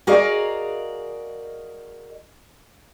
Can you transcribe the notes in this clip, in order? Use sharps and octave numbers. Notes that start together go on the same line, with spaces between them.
F#4 G#4 A#4 D5 D#5 F5